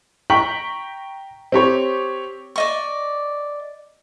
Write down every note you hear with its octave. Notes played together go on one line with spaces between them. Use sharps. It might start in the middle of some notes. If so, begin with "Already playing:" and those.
G5 A#5 C#6 B6 F#7
C4 G4 C#5
D5 D#5 C#6